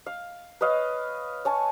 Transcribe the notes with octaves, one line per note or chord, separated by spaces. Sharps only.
F5
B4 C#5 D#5 F5
C#5 G#5 A5 C#6